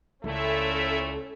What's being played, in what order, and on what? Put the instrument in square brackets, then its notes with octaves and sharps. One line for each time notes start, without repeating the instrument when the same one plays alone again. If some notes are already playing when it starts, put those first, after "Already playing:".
[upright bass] C#2 [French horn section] A#2 A3 E4 [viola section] C#4 A4 [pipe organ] E5